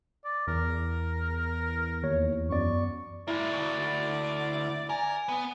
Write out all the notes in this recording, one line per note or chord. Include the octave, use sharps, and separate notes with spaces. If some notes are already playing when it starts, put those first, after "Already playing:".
D5
E2 A#4
D#2 C#5
F#2 B3 D5 C#6
G#3 A#3 E4 D5
D2
A#4 G#5
B3